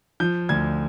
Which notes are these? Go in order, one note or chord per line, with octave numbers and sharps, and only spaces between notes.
F3 G6
D2 G#6